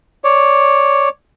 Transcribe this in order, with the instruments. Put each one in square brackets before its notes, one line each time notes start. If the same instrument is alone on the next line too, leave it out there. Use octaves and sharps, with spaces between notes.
[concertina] C#5 D5